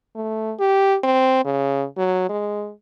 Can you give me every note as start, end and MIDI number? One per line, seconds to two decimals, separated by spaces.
0.15 0.54 57
0.60 0.97 67
1.04 1.40 60
1.45 1.85 49
1.97 2.25 54
2.29 2.71 56